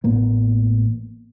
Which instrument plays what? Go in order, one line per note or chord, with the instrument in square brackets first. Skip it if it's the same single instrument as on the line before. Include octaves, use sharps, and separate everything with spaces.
[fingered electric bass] A1 A2 A#3 B3